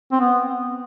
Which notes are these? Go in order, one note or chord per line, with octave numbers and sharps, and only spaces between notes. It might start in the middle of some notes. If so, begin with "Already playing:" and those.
C4
B3